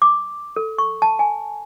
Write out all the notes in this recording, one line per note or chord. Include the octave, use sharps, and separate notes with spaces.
D6
A4
C#6
A5
G#5